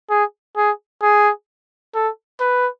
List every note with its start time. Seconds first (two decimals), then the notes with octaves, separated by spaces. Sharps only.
0.10 G#4
0.57 G#4
1.02 G#4
1.95 A4
2.40 B4